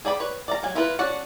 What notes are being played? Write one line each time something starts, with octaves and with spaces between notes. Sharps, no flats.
G#4 D5 G5 B5
B4 C#5
D5 F5 A#5
F#3 F5 G#5
E4 F4 A#4 B4
C#4 D4 F#4 D5 F#5